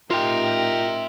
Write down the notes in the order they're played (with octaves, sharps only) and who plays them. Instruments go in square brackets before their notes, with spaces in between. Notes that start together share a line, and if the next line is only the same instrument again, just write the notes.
[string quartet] A2 D#4 G4 [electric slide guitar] F4 G5 [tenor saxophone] A#4 [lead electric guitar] E5 C6